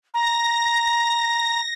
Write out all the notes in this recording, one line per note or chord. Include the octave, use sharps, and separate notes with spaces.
A#5 A#6